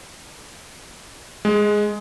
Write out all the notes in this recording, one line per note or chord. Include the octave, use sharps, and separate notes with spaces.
G#3